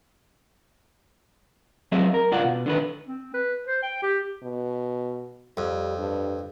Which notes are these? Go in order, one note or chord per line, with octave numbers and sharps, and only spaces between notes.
F#3 C4 G#4 D#5 E5
A#4
C#2 G#2 F4 D5 F#5
B2
D3 D#3 B4
C4
B4
C5
G5
G4
B2
F2 G3
G2